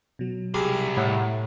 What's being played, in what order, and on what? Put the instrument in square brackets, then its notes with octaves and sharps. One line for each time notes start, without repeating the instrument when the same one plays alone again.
[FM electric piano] B2 F#3
[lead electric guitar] C2 [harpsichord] G4 G#4
[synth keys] A2 [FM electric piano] F#5 B5